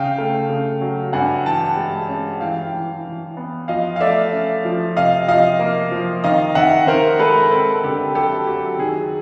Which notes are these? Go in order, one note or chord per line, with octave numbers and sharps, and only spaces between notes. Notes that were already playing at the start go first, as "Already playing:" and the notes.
Already playing: C#3 F5 G5
A3
C#3
F#3
G2 F#5 G#5
E3 G5 A5
G#3
C#4
E3 F5 G5
E3
E3
B3
F3 D#5 F5
F5
A3 D5 E5
C#4
F3
C3 D#5 F5
F3 D#5 F5
A#3
F3
D#3 D#5 F5
D#3 E5 F#5
D#3 A#4 C5
G#3 A4 B4
C4 A4 B4
D3 G4 A4
F#3 G4 A4
F#3 G4
D#3 G#4